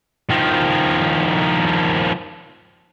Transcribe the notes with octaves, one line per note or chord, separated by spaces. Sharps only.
D#3 F3